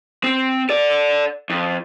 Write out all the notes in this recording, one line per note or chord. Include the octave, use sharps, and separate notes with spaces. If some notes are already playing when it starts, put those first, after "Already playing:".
C4
A4 D5
F2